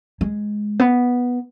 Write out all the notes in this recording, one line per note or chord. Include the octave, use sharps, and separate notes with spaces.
G#3
B3